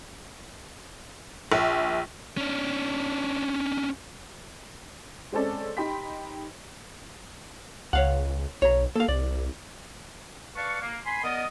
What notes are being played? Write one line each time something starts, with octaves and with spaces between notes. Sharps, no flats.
A#1
C#4 D4
G#3 C4 C#4 A4 D5
D#4 G4 G5 B5 C6 B6
C#2 C#5 F5 F#5
B1 C#5 A#5
A#3 A4 F5
C2 D5
B4 D5 F5 A5 C#6
A#3
G#5 B5 C6
B3 A#4 D5 D#5